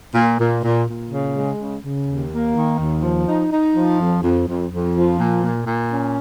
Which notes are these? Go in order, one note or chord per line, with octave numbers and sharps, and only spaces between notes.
A#2
A#2
A#2
A#2
C#3
G#3
C#3
C#3
D#2
A#3
D#3
D#2
F3
D#4
D#4
F3
F2
F2
F2
F2
F3
A#2
A#2
A#2
C#4